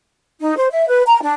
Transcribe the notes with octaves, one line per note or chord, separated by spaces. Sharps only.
D#4
C5
E5
B4
A#5
D4